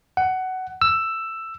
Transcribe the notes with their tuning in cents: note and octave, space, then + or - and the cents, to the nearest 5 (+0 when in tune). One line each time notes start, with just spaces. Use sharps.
F#5 +15
E6 +10